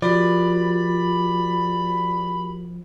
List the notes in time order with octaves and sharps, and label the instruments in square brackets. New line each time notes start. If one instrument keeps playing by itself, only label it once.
[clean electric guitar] F3 [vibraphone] F#4 G4 A#4 [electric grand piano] D5 [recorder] B5